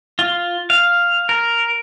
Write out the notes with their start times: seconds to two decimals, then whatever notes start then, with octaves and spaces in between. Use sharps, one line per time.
0.19 F4
0.70 F5
1.29 A#4